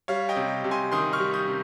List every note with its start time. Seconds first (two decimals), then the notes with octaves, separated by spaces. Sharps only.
0.08 G3 C#5 F5
0.29 D#5 G5
0.36 C3
0.64 C3
0.71 G#5 C6
0.92 D#3 C6 D#6
1.13 C#6 F6
1.19 G3
1.34 D#6 G6
1.48 C3